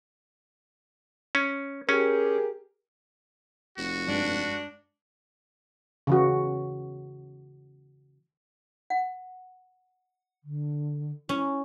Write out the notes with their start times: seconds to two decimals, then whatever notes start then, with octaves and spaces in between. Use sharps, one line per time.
1.35 C#4
1.89 C#4 G4 G#4 A#4
3.78 F1 F#4
4.08 G2 G#3 D4
6.07 C#3 E3 F#4
8.90 F#5
10.44 D3
11.29 C#4 E4